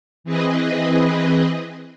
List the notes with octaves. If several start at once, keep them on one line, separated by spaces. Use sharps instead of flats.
E3 C4 G#4 B4 D#5